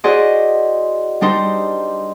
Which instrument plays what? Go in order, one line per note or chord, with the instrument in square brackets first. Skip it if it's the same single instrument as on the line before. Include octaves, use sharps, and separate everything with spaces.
[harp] E4 F#4 G#4 C5 D5 D#5
G3 D4 D#4 C5